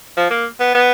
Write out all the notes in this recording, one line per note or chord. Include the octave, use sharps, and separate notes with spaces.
F3
A#3
B3
B3